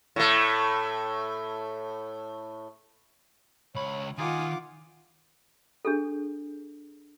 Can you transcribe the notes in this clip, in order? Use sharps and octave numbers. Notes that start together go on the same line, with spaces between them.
A2 A3
C#2 C#5 B5
D#3 F4 F#5 G#5 D6 D#6
D4 G#4 A4